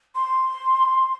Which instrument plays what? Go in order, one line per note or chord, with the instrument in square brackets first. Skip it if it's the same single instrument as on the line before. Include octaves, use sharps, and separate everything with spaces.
[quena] C6